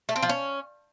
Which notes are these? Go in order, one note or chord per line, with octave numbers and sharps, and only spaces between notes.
A3
C4
F3
C#4